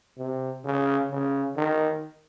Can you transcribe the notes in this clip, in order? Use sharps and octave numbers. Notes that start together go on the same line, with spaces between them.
C3
C#3
C#3
D#3